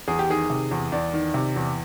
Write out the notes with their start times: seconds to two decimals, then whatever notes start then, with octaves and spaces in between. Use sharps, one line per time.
0.08 E2 G#4
0.19 G4
0.29 D#3 G#4
0.50 C3
0.71 E2
0.92 E2 D5
1.13 D#3
1.34 C3
1.56 E2